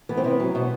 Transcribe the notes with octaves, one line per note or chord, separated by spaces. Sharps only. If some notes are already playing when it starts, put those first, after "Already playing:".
E3 B3
C4
C3 B3
F#3
B2